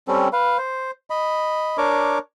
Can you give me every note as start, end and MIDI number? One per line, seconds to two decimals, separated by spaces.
0.08 0.28 55
0.08 0.28 60
0.08 0.28 61
0.08 0.28 69
0.33 0.57 71
0.33 0.57 77
0.58 0.91 72
1.10 1.77 75
1.10 1.77 83
1.78 2.18 62
1.78 2.18 70
1.78 2.18 73
1.78 2.18 86